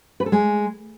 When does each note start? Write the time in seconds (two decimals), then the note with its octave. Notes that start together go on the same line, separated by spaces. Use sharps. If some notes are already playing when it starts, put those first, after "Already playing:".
0.20 B4
0.26 A4
0.32 G#3